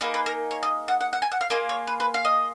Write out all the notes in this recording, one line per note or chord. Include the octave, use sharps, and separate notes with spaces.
A#3 D#4 G#4 B4
B4
A#4
C#5
D#5
F#5
F#5
F#5
G#5
F#5
F5
A#3 F4 G#4 D#5
C#5
B4
B4
F5
D#5